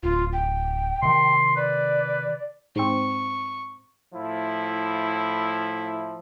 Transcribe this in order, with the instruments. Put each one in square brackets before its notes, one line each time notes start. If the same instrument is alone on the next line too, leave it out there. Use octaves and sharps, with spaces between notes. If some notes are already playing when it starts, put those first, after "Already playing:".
[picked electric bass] D1 [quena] F4
[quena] G5
[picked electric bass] C3 D#3 [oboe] C6
[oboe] B4 [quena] D5
[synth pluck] G#2 C4 [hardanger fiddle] C#6
[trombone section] A2 F3 E4